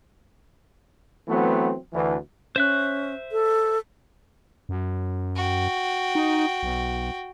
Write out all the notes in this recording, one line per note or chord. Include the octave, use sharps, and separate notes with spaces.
E3 F#3 A3 B3 C4
D2 E3
C#4 C5 E5 F#6
A4
F#2
F#4 G5
D#4
B1